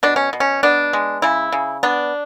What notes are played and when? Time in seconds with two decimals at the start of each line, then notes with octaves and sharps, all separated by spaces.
0.03 B2 D4
0.16 C#4
0.33 B2
0.40 C#4
0.63 B3 D4
0.93 G#3
1.22 C#3 E4
1.52 C#3
1.83 B3 D4